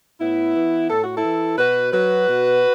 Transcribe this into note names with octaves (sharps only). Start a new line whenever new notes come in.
A2 B3 E4
E3
A2 A4
F#4
E4 A4
E3
B2 F#4 B4
F#3 F#4 B4
B2